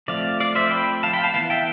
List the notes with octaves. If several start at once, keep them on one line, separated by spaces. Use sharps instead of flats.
F3 A3 C4 D5 F5
D5 F5
C5 E5
G5 B5
F5 A5
G5 B5
F5 A5
E3 B3 F5 A5
E5 G5